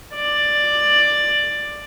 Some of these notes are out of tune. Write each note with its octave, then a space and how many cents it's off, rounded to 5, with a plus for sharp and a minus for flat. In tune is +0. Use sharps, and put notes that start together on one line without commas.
D5 +10